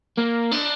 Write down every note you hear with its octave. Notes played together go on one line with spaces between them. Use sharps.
A#3
D4